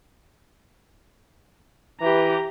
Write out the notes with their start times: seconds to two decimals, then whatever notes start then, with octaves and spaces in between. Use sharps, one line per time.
2.01 E3 G4 A#5